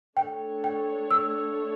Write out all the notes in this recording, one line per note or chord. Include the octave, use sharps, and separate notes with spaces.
A3 D4 A4 C#5 G5
G5
E6